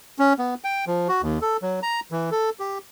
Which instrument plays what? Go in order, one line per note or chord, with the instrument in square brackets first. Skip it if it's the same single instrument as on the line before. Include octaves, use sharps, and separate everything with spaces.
[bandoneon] C#4
B3
G5
F3
F#4
D#2
A4
F#3
A#5
E3
A4
G4